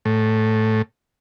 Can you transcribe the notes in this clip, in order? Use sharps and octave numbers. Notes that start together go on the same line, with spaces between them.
A2